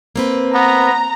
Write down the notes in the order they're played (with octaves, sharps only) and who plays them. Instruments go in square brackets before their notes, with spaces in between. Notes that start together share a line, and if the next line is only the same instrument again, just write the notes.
[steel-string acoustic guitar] A#3 C4 B4
[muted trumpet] B3 [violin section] A#5